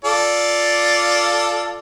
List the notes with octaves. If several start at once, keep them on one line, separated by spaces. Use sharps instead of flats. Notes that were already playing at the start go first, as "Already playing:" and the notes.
F4 A4 D5